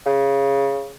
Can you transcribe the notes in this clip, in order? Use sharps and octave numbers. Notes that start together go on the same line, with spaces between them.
C#3